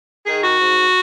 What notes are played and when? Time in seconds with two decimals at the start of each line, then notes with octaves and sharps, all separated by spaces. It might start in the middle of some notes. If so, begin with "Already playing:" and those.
0.26 D#3 G#4
0.44 F#4
0.60 G#2